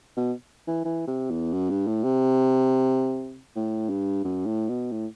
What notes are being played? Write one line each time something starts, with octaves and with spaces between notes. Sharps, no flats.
B2
E3
E3
C3
E2
F#2
G2
A2
C3
A2
G2
F#2
A2
B2
A2